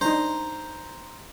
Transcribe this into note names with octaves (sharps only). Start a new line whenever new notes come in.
D4 D#4 C5 A#5